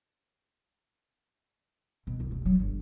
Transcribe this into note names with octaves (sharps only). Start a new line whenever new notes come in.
B2
C2
F1
F#3
G1